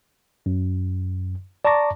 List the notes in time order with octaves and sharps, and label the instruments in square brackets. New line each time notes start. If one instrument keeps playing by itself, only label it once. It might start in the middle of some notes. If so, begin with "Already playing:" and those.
[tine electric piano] F#2
D5 A5 A#5 C#6 D6 A#6